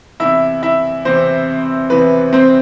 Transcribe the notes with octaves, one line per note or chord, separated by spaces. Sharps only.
E2 C3 E3 E4 E5
E4 E5
E2 C3 E3 C4 C5
E2 C3 E3 B4
C4 C5